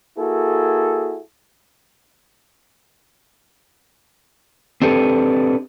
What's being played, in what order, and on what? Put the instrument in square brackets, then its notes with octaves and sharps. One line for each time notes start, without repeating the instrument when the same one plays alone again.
[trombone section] A#3 E4 F#4 G#4 A4
[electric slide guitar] C4 D4 G4 A4 B4